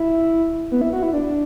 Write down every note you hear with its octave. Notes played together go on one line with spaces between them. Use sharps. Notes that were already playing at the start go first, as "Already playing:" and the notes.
Already playing: E4
B3
E4
F#4
E4
D4